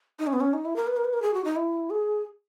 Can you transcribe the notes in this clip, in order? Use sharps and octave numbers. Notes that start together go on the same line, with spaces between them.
D#4
C#4
B3
C#4
D#4
E4
A#4
B4
A#4
B4
A#4
G#4
F#4
D#4
E4
G#4